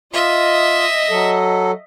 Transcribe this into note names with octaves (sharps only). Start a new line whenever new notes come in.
F4 D#5 E5
F#3 A4